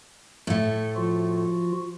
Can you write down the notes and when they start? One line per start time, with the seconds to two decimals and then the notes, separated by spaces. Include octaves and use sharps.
0.47 A2 A3
0.96 F3 F4 F#4